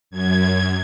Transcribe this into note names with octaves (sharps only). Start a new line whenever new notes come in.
F#2 G#6